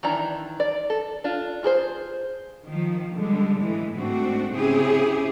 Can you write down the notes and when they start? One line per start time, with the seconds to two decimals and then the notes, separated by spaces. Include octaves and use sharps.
0.03 D#3 E3 D4 A#5
0.60 D5
0.90 A4
1.24 D4 F4
1.63 F4 G#4 A4 C5
2.65 D#3 F3
3.14 D3 G3 G#3
3.59 A2 E3 G#3
3.95 G#2 A3 C4 D4 F#4
4.55 C#3 C4 E4 G4 G#4